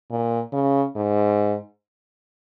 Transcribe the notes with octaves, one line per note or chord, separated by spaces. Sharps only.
A#2
C#3
G#2